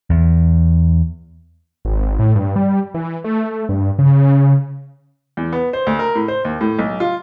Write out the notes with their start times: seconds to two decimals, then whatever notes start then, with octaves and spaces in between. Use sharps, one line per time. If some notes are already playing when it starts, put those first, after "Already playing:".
0.10 E2
1.85 G#1
2.19 A2
2.36 G2
2.56 G3
2.94 E3
3.24 A3
3.69 G2
3.99 C#3
5.37 E2
5.52 B3
5.73 C5
5.87 D2
5.99 A#4
6.15 A2
6.28 C5
6.45 D#2
6.61 A2
6.79 B1
7.00 F4